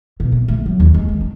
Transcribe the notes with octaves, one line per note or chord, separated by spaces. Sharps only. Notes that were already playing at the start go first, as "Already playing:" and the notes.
B2
A#1
A3
F#3
D#2
G#3
D#3
D4